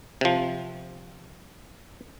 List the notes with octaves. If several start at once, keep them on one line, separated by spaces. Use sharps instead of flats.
C3 F3